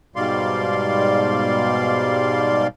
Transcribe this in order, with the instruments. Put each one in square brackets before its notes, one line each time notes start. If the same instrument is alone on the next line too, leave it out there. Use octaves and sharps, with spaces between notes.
[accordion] G#2 B2 G3 D5 F5 C6